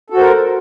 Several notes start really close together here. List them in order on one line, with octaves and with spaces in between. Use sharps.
A4 F#4 C5 A#4